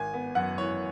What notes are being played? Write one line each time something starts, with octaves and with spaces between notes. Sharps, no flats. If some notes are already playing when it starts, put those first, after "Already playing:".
Already playing: G#1 G#5
B3
F#2 F#5
E3 C#5